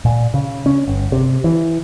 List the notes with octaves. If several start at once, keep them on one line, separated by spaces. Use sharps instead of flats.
A#2
C#3
C#4
G1
C3
E3